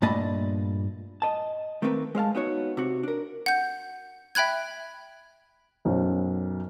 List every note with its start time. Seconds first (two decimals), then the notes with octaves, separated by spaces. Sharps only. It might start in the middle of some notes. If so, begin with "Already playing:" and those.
0.02 G2 A#2 A3 D#5 A5 B5
1.22 D#5 A5
1.82 D#3 A3 A#3 C4 A#4 B4
2.15 G#3 C5 F5 A5
2.35 B3 D#4 F#4 C#5
2.77 C3 F#4
3.03 D4 A#4
3.46 F#5 G6
4.35 E5 G5 B5 F#6 G#6
5.85 B1 F#2 C5